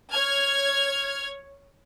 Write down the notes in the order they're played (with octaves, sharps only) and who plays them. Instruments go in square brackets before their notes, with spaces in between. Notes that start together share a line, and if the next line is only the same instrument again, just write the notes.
[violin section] C#5 F6 G#6